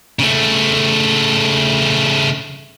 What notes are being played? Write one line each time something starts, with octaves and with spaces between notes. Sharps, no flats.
C#3 A3